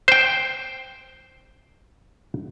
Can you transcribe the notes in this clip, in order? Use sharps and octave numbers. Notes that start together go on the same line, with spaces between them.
C5 G5